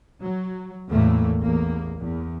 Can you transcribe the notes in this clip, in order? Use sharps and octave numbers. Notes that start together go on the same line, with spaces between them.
F#3
E2 A2 A3 A#3
A1 E2 A#3
E2